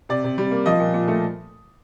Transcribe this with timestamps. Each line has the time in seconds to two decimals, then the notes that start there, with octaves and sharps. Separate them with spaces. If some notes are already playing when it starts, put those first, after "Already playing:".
0.09 C3 D5
0.24 C3
0.38 G3
0.51 A#3
0.66 F3 D#5
0.80 A#2
0.94 A#2
1.08 A3